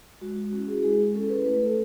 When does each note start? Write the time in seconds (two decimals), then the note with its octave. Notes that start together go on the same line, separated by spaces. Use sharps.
0.21 G#3 F#4
0.36 F#4
0.52 C#4 F#4
0.57 E4
0.67 G#4
0.83 G#3 G#4
1.14 C#4 A4
1.19 E4
1.29 B4
1.45 A3 B4
1.62 A4